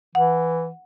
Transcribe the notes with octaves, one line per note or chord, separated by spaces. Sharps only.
E3 F#5